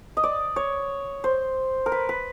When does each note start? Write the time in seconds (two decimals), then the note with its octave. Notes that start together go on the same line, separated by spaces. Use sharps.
0.17 D#5
0.24 D5
0.56 C#5
1.24 C5
1.86 A#4
1.92 B4
2.09 B4